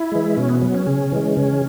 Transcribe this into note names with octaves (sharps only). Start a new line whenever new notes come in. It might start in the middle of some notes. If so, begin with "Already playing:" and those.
Already playing: E4
E3 G#3
B2 C#4
B3
F#3 B3
C#4
C#3 C#4
E3 G#3
C#3